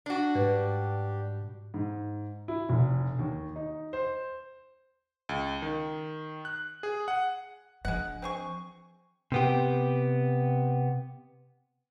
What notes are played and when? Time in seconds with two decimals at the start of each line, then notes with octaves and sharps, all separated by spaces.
0.06 D4 F#4
0.35 G#2 G3 G4 B4
1.74 G#2
2.48 E4
2.69 F1
3.19 D#2
3.56 D#4
3.93 C5
5.29 C#2
5.62 D#3
6.45 F#6
6.83 G#4
7.08 F#5
7.85 F3 G#3 D4 F#5
8.22 C4 G#4 C#6
9.32 C3 B3 G4